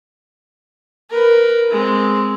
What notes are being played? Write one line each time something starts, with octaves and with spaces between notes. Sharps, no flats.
A#4 B4
G#3 C4